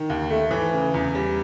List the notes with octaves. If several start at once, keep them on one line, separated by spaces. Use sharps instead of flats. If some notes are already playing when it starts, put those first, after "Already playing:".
Already playing: D#3
D#2
A3
E3
C#3
E2
G3